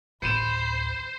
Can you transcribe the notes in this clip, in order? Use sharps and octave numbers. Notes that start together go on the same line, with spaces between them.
A1 D2 C5 B5 C#7 D#7 E7